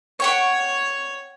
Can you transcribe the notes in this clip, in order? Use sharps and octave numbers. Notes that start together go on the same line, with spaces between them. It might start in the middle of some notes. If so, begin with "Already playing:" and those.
C#5 F#5 G5 C#6